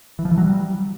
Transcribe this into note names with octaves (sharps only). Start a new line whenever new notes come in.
E3
F3
E3
F#3
G3